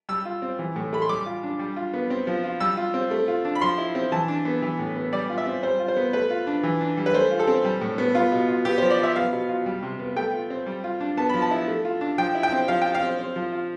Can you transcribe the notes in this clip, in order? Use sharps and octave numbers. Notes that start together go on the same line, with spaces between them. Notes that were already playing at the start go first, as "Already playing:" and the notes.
G3 E6
F4
C4
E3
A2
A3 B5
C6
G3 D6
F4
D4
G3
F4
B3
C4
F3
F4
G3 E6
F4
C4
A3
F4
D4
B5
F3 C6
E4
C4
E3 A5
D4
B3
E3
A2
B3
G3 D5
F4
E5
C4
G3 C5
F4
C5
B3
A3 B4
F4
D4
E3
D4
G3
B4
A3 C5
F4
A4
C4
G3
A2
B3
B3 F4
B2
F4
B3 G4
F3 C5
D5
F4 E5
B3 F5
B2
F4
G3
C3
B3
A3 G5
F4
C4
G3
F4
D4
B3 A5
F3 B5
A5
E4
A3
F4
D4
F3 G5
E4
G5
C4
F3 F5
F4 G5
F5
C4
C4
F3
F4